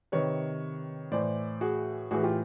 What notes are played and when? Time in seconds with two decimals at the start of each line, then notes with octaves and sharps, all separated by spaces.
0.12 C3 D#3 B4 C#5
1.12 A2 E3 C5 D5
1.61 F#4 G#4
2.11 A2 E3 F#4 G#4
2.23 F4 G4